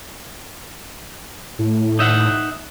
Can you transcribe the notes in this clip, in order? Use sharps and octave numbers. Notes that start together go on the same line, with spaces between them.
A2
D#4 E5 F#5